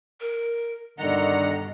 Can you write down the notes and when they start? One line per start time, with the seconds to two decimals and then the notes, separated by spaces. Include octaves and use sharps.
0.20 A#4
0.99 G2 B2 D3 D#3 D#5 F#5 A#5